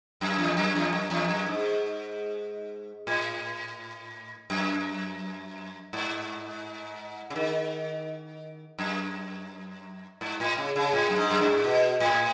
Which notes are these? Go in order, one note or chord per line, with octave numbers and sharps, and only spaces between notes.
F#2
E2
F#2
E2
F#2
E2
F#2
G#2
A2
F#2
G#2
C#3
D#3
F#2
G#2
A2
C#3
C#3
A2
F#2
G#2
F#2
G#2
B2
A2